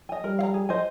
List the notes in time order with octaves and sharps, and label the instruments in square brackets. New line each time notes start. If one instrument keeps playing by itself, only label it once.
[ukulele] D#5 G#5
[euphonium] G3 [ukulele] A#4
[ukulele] F5
A#5
G#4
C5 D#5 G#5